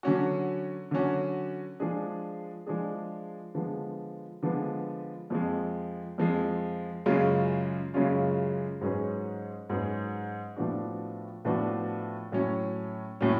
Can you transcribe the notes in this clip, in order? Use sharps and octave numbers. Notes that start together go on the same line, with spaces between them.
D3 F#3 C#4 F#4
D3 F#3 C#4 F#4
F3 G#3 D4 G#4
F3 G#3 D4 G#4
D3 F3 G#3 B3
D3 F3 G#3 B3
F2 F3 G#3
F2 F3 G#3
F#2 C#3 G#3 C#4 F4
F#2 C#3 G#3 C#4 F4
G#2 F#3 C#4 G#4 B4
G#2 F#3 C#4 G#4 B4
A2 F3 B3 D4 F#4
A2 F3 B3 D4 F#4
A2 F#3 C#4
A2 F#3 C#4